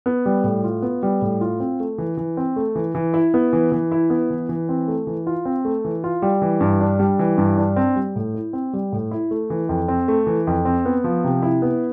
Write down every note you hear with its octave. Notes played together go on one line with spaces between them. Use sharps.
B3
G3
A2
F4
B3
G3
A2
F4
C4
A3
E3
E3
C4
A3
E3
E3
E4
B3
E3
E3
E4
B3
E3
E3
C4
A3
E3
F4
C4
A3
E3
F4
G3
E3
G2
D4
G3
E3
G2
D4
C4
G3
A2
E4
C4
G3
A2
E4
A3
E3
F2
C4
A3
E3
F2
C4
B3
F3
C3
E4
B3